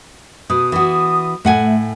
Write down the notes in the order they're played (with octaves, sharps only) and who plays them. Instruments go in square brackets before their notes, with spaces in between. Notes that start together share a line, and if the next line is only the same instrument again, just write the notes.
[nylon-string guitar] B2 [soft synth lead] D#6
[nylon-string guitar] E3 F#4
[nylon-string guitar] A2 F#5 G#5 [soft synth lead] A3